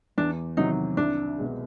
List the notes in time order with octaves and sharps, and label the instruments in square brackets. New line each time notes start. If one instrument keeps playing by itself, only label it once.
[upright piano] E2 [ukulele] D4
[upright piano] C3 D#3 F#3 [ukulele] D#4
[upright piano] C2 [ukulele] D4
[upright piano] B2 G#3